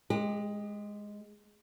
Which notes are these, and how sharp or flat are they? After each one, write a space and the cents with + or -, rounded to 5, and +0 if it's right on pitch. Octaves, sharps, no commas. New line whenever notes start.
G#3 +0 G4 +35